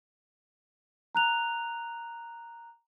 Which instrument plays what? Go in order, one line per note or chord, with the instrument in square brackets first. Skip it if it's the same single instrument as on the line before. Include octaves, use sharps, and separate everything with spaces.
[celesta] A#5 F#6 F7